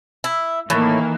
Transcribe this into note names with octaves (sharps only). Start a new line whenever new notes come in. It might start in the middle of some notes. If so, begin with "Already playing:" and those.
E4
A2 D#3 E3 A#3